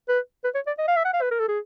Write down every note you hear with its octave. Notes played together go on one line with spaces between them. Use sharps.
B4
B4
C#5
D5
D#5
F5
E5
F#5
F5
B4
A#4
A4
G#4